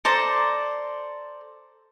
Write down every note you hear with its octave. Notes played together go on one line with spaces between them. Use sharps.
A4 C5 D5 A#5